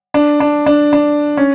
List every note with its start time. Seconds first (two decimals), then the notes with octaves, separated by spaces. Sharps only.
0.14 D4
0.40 D4
0.66 D4
0.93 D4
1.37 C#4